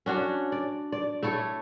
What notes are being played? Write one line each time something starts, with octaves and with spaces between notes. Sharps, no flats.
C#4 D4 F#4 C#5
D5
D5
A3 E4 A4 C#5